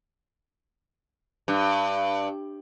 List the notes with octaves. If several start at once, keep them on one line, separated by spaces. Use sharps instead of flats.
G2